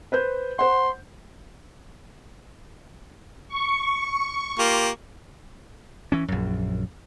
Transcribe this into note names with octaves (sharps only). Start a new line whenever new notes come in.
B4 C5 G6
C5 F#5 C6
C#6
A#3 F4 G4
E3 C#4
A#1 F#2